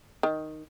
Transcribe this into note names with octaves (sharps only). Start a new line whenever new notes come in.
D#3